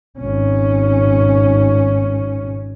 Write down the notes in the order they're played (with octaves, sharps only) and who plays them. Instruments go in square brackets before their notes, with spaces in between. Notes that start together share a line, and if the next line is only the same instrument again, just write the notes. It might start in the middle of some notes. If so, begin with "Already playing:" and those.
[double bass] G#1 C#4